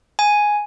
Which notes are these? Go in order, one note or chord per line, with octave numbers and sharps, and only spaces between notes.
G#5